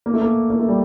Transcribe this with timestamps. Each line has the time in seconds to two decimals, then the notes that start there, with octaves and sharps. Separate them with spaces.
0.06 A#3
0.14 A3
0.21 A#3
0.50 A#3
0.59 A3
0.68 G3